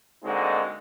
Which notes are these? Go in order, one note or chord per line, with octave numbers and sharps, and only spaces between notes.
D3 G#3 A#3 C4 D#4 F#4